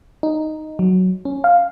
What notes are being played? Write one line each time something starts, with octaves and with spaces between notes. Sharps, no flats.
D#4
F#3
C#4
F5